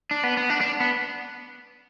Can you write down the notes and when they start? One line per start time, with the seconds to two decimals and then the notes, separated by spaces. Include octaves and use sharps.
0.11 D4
0.24 B3
0.37 B3
0.50 D4
0.61 D4
0.80 B3